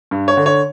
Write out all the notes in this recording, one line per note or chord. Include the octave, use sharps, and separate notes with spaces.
G2
C#5
D3
C#5